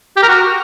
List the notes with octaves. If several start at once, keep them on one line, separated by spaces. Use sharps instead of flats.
G4
A#4
F#4